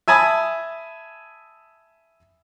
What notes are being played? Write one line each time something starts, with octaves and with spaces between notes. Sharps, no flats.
E5 G#5 A5 B5 D#6